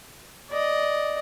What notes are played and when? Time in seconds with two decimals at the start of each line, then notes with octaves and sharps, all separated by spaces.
0.50 D5 D#5